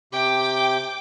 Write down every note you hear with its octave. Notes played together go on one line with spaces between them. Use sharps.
C3 G4 G5 D6